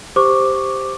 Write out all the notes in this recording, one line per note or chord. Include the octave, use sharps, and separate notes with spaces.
G4 C5 C#6 D6